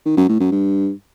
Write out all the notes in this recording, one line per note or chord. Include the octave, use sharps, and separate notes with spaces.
D#3
F#2
A2
F#2
G2